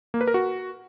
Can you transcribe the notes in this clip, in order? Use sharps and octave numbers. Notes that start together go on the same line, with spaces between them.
A#3
B4
A#4
F#4